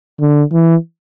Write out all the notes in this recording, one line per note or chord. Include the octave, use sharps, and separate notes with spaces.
D3
E3